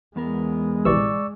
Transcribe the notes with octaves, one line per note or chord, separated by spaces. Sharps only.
E2 G#3 B3 A#4
A#1 C3 E3 D5 C#6 E6